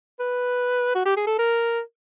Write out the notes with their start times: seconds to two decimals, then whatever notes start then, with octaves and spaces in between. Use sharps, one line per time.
0.20 B4
0.95 F#4
1.05 G4
1.17 G#4
1.27 A4
1.39 A#4